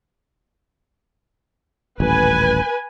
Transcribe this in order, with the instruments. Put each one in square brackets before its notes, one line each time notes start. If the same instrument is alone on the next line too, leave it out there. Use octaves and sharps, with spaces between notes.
[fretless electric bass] D#1 A1 [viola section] B4 G#5